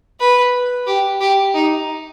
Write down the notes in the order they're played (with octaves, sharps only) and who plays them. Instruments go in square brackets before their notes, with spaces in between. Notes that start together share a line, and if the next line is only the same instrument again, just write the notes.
[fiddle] B4
G4
G4
D#4